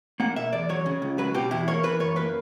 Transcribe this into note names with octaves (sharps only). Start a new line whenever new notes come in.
A#3 F#5
B2 E5
E2 D5
F#3 C#5
C#3
C#2
F#3 B4
B2 G4
E2 E4
A#3 C#5
E3 B4
F#2 C#5
A#3 B4